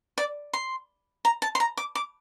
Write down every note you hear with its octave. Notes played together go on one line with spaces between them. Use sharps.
D5
C6
A#5
A5
C6
A#5
D6
D6